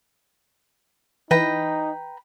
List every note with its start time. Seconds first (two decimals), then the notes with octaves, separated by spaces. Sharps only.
1.31 E3 D#4 B4 G5 A#5